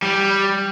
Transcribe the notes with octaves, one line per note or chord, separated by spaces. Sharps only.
G3